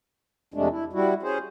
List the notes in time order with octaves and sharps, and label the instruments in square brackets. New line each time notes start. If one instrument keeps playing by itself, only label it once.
[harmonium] F2 C3 G#3 A3 D4
E4
G3 E4 F#4
C#4 G#4 C5